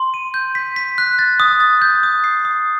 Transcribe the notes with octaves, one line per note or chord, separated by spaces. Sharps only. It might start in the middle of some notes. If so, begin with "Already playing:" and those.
Already playing: C6
D#7
G6
B6
B6
F#6
A6
D#6
A6
G6
D#6
C7
D#6